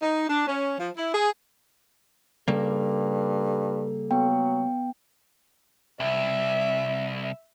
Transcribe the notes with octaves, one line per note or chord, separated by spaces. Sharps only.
D#4
D4
C#4
F3
E4
G#4
G2 C#3 G3 A#3 A4
F#3 B3 G5
C2 E5